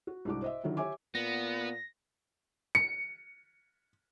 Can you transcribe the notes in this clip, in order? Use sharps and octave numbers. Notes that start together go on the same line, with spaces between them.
F#4
C2 G#2 D4 F#4 D6
C5 D#5 E5
D3 D#3 F#3 E4 F4
G4 C#5 E5 G#5 D6
A#2 B3 A#6
C#7